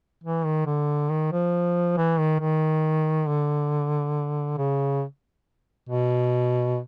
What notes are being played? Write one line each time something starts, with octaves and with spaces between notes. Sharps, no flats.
E3
D#3
D3
D#3
F3
E3
D#3
D#3
D3
C#3
B2